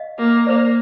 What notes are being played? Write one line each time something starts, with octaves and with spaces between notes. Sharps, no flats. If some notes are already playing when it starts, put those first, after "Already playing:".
Already playing: D#5 F5
A#3
A#3 C5 D5